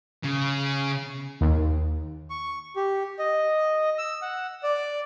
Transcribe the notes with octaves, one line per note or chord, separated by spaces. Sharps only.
C#3
D#2
C#6
G4
D#5
E6
F#5
D5